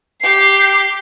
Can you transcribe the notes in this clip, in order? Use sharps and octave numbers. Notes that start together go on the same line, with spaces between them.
G4 C7